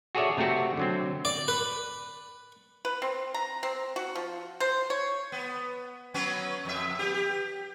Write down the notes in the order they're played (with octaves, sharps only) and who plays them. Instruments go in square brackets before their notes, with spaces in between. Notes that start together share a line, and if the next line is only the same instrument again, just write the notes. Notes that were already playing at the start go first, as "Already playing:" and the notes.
[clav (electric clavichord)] F#4 G#4 A4 C#5 D5 E5
C3 A3 C4 F#4 G4
D3 F#3 C4
[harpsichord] D5
B4
[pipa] B4
C4
A#5
C4
F#4
F3
C5
C#5
[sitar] B3
F#3 B3 C#4
F2 E5
B3 G4
G4